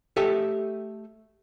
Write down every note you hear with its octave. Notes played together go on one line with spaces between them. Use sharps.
A3 G4 A4 D#5 E5